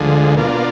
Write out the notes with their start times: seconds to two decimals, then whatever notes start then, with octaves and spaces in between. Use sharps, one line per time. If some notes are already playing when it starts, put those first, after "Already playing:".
Already playing: D2 D3 F3 G#3
0.35 B2 A#3 D4 F4